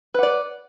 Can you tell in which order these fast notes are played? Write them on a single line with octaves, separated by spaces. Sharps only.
B4 F#5 D5